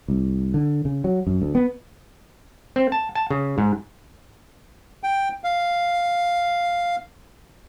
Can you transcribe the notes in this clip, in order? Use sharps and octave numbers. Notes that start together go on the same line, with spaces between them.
C2
D3
C#3
F#3
F#2
D2
B3
C4
A5
A5
C#3
G#2
G5
F5